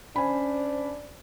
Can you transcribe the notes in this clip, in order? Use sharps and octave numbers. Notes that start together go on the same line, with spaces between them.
C#4 D4 C5 G#5 B5